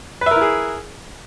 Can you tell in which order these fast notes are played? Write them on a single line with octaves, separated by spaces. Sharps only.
B4 E5 A#4 E4 G#4